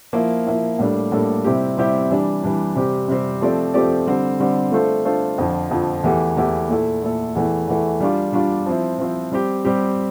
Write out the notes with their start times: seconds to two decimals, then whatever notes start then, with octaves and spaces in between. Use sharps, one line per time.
0.13 F3 A#3 E4
0.47 F3 A#3 E4
0.79 A2 G3 A#3 D4 A4
1.12 A2 G3 A#3 D4 A4
1.44 C3 G3 C4 E4 G4
1.77 C3 G3 C4 E4 G4
2.10 E3 G3 D4
2.43 E3 G3 D4
2.76 C3 G3 C4 G4
3.08 C3 G3 C4 G4
3.41 F3 A3 C4 G4 D5
3.74 F3 A3 C4 G4 D5
4.07 D3 G3 C4
4.40 D3 G3 C4
4.72 A3 D4 F4 A4 C5
5.05 A3 D4 F4 A4 C5
5.38 F2 D3 F3
5.71 F2 D3 F3
6.04 E2 E3 A3 E4 G4
6.37 E2 E3 A3 E4 G4
6.69 A#2 A3 E4 A4
7.02 A#2 A3 E4 A4
7.35 E2 E3 A3
7.68 E2 E3 A3
8.00 G3 D4 F4
8.33 G3 D4 F4
8.66 F3 C4 E4
8.98 F3 C4 E4
9.32 G3 C4 G4
9.65 G3 C4 G4